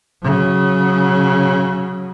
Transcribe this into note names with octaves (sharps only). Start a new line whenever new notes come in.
C#3 F#3